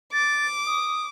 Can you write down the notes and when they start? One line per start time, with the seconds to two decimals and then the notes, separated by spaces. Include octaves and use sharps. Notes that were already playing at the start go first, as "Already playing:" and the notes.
0.13 D6 A6
0.66 D#6